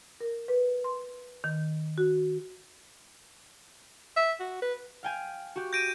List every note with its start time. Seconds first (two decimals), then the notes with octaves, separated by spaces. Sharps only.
0.20 A#4
0.48 B4
0.84 C6
1.44 D#3
1.98 F#4
4.17 E5
4.40 F#4
4.62 B4
5.03 F5 G5 G#5
5.56 F#4 G4
5.73 G6 A#6 D7 D#7